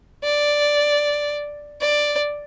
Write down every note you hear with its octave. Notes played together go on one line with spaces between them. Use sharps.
D5
D5